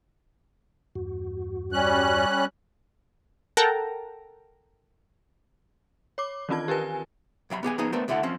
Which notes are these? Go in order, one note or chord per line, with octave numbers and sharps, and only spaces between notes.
E2 G2 F#4
G3 C#4 F#6
A4 A#4 F#5 G5 A5 A#5
C#5 D6
D#3 E3 C4 F4 A5 G#6
G4 A#4 B4 G#5
C2 F#3 F5 B5
B3 G4 G#4 G#5
F3 B3 D#4 G#4
A3 B3 D4 A#4 C5
D2 D3 A3 E4 F#5
F3 C4 C#4